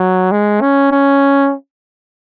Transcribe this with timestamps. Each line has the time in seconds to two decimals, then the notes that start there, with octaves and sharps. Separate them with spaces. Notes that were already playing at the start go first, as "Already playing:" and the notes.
Already playing: F#3
0.31 G#3
0.61 C#4
0.92 C#4